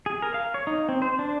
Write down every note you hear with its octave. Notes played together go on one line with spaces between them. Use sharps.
G#4
A#4
F5
C#5
D#4
C4
C5
D4